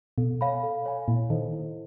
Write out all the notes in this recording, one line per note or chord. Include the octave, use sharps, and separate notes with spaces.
B2 A4
C#5 F5 G#5 B5
A4
C#5 F5 G#5 B5
A#2 E4
D#3 A4 C5 D#5
E4